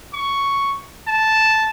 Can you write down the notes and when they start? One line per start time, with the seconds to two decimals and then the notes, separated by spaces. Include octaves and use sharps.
0.14 C#6
1.07 A5